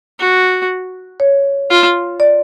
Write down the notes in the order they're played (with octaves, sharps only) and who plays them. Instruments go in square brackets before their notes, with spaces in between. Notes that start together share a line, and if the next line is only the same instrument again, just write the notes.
[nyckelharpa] F#4
[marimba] C#5
[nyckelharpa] F4
[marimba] D5